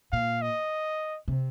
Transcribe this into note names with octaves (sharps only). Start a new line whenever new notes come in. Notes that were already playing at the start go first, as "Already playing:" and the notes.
A#2 F5
D#5
C3